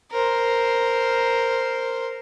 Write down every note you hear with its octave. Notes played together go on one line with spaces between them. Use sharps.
A#4 C5